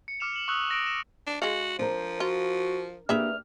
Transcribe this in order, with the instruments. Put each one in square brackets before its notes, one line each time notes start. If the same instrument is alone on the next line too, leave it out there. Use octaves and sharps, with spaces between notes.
[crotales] C#7
D6 F6 C#7 E7 F7
F#7
C#6 D#6 E6 F#6 F#7
D#6 A#6 D7
E7
[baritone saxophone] D4
[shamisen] G#3 F5 [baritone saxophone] F#4
[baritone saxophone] F3 [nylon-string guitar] D4 A#4 [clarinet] C5
[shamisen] F4 [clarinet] F#4
[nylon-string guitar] A#3 D4 G4 [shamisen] G#4 B4 E5 [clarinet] F6